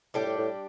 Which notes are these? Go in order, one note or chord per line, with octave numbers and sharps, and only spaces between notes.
A2 G3 D4 G4
A2
A2